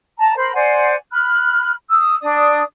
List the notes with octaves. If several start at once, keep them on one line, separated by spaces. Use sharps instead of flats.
A5 A#5
A#4 C5 B5
C5 D5 F#5 G#5
B5 F6 F#6
D#6 E6
D4 D5 D#6